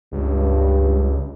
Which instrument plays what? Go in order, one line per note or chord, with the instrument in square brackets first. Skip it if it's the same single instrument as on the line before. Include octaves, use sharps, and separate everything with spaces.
[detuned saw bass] C#2 [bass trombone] G2